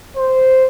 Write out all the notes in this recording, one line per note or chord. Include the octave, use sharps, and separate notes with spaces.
C5